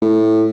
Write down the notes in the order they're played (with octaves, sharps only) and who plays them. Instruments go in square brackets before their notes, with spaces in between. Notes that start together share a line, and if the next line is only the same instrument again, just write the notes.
[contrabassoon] A2